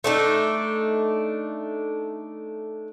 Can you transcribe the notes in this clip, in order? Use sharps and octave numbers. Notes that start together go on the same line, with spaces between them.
A3 D4 D#4